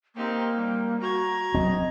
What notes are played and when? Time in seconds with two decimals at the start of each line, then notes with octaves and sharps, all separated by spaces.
0.15 A#3 C4 D#4 G4
0.54 G3
1.01 F#4 A#5 G#6
1.55 F#3 C4 D#5